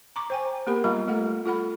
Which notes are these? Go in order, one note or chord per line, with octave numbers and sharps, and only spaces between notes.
A#5 C#6 D6
C5 G5 G#5
A#3 B3 G4 A#4 B5
G3 F4 F5 A#5 B5
G3 A3 A4 F#5
F4 A4 F#5 B5